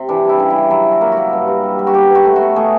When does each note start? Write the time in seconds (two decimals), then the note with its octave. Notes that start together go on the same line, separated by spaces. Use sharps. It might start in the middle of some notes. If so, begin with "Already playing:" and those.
Already playing: C3
0.09 E3 D4
0.25 G3 E4
0.40 C#3
0.50 E4
0.56 C#3
0.70 F#3 E4
0.86 F#3
0.91 F#4
1.01 A#3
1.12 F#4
1.17 A#3
1.33 G2
1.48 G2
1.63 G3
1.79 G3
1.87 F#4
1.94 B2 G4
2.10 B2 F#4
2.25 A3
2.36 F#4
2.41 B2
2.56 A3 G#4